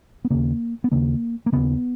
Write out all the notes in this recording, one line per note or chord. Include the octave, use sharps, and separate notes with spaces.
B3
D#2 C#3 A#3
B3
D#2 C#3 A#3
A#3
D#2 C#3 B3